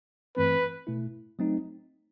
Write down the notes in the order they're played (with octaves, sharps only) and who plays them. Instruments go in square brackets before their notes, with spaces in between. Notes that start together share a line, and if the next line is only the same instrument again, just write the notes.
[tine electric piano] G2 E3 A3 C4 [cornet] B4
[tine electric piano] B2 A3 E4
F#3 A3 C4 D#4